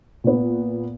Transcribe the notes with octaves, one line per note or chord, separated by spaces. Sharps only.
A#2 B3